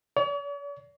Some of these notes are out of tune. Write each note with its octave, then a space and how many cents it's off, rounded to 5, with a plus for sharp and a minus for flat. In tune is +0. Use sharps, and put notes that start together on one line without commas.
C#5 +45